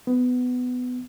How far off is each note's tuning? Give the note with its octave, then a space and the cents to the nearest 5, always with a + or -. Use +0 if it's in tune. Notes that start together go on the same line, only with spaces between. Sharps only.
B3 +15